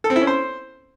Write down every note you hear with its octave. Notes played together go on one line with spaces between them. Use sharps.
A4
C4
E4
C#4
C5